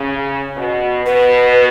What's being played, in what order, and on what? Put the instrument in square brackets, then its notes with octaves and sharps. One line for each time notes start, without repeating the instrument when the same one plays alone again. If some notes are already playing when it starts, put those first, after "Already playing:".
Already playing: [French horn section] C#3
B2
[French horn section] B2 [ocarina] B4